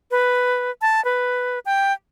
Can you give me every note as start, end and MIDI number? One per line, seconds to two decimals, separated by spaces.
0.11 0.71 71
0.82 1.03 81
1.05 1.59 71
1.66 1.93 79